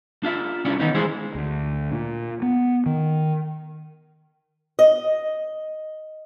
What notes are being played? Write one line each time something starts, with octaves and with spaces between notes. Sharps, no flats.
D4 F4 E5
C2 C#4 E4 D5
D#3 E3 B3 C#4 D#4
E3 G#3 E4 G#4 C5
D2
A#2
B3
D#3
D#5